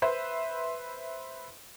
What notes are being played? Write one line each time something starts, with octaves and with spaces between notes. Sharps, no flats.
B4 C5 E5 C6